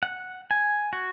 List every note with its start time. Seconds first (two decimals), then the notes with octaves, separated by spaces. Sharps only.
0.03 F#5
0.51 G#5
0.93 F#4